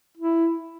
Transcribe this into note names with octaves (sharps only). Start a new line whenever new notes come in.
E4